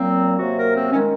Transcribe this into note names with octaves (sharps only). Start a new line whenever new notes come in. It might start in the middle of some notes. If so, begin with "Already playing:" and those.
Already playing: A#2 F#3 A#3 C4
C3 F#3 A#3 F#4
A#4
C4
D#3 G#3 C#4